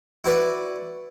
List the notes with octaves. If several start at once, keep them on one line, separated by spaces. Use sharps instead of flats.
E4 F#4 B4 D5